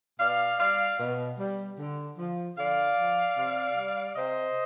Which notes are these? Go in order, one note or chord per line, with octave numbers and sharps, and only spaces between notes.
B2 D5 F5
G3 D5 F5
B2
G3
D3
F3
D3 D5 F5
F3
C3
G3
C3 C5 D#5